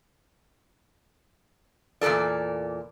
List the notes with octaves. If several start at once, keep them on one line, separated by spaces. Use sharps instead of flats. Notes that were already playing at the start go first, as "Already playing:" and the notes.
E2 A#2 G#3 A4 D5